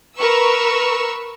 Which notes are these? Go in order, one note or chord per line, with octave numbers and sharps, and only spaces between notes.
A#4 B4 C#6 E6